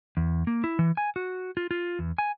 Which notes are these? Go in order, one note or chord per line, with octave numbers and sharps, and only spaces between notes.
E2
A#3
E4
E3
G#5
F#4
F4
F4
E2
G#5